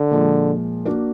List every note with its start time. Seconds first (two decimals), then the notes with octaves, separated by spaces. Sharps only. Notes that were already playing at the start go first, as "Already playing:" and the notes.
Already playing: D3
0.11 A#2 F3 G#3
0.85 A#3 D4 F#4